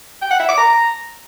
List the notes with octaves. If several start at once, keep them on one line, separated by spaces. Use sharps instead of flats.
G5
F#5
E5
D6
A#5